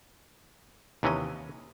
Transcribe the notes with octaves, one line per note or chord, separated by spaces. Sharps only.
D#2 C3 E3 C#4 D#5